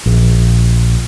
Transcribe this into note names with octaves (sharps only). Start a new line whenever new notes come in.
A#1